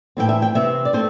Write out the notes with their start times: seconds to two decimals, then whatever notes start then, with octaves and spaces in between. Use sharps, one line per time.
0.17 A2 E3 C4 G5
0.29 E5
0.42 G5
0.54 C3 E3 C4 E5
0.85 D5
0.93 C3 A3 C4 C5